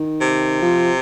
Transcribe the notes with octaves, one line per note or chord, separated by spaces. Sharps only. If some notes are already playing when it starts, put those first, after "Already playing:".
Already playing: D#3
C3
F3